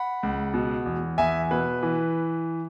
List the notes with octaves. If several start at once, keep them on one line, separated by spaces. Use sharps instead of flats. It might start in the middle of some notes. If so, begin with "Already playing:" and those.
Already playing: F#5 B5
C#2
B2
E2
E2 E5 G#5
B2 B4
E3